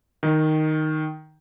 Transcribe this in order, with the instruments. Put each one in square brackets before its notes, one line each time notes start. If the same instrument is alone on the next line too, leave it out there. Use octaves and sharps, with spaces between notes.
[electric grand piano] D#3